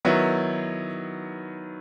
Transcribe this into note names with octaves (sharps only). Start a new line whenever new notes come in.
D#3 F#3 B3 E4